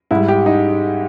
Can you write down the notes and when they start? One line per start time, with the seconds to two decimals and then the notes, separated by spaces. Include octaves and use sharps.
0.11 G#2 G3 E4
0.28 G4
0.46 D#4